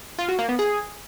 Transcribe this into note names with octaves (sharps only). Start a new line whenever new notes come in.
F4
F#4
A#3
B3
G#4